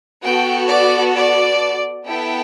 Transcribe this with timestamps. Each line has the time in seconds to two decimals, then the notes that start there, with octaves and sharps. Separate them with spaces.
0.23 B3 F#4 A4 G5
0.68 D5
1.15 D5
2.06 B3 E4 A4 G5